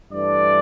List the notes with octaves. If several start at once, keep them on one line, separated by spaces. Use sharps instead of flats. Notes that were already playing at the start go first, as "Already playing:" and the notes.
G2 E3 A3 D4 D5